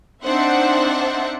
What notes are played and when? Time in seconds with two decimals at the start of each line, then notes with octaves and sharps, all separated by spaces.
0.24 C4 D4 D#4 C5 E5 F#5